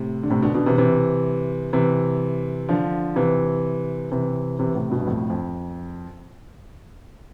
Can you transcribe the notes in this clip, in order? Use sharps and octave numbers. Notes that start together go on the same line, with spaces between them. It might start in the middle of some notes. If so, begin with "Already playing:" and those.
Already playing: A2 C3
D3
A2 C3
B2 D3
B2 D3
C3 E3
C3 E3
C3 E3
D3 F3
C3 E3
C3 E3
C3 E3
A2 C3
G2 B2
G2
F2 A2
F2